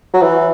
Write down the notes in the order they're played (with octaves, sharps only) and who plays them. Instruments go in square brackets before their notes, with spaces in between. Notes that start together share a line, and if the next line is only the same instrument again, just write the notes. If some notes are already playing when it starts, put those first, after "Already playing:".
[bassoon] F#3
E3